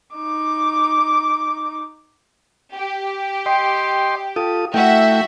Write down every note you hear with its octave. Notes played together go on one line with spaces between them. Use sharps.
D#4 D6
G4
D#5 G5 C6
F4 A4 D#6
A3 E4 F#4 E5 G5